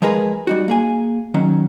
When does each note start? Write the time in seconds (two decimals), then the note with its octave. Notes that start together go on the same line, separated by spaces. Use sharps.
0.02 F3 G#3 G#4 A#4 B4
0.47 G3 D#4 F#4
0.68 A#3 G#4 G#5
1.34 D#3 F#3 C#4